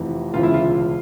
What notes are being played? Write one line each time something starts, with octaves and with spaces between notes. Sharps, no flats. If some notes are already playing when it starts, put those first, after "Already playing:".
Already playing: F1 F2 E3
E1 D2 C#3 E3 F4
E4
F4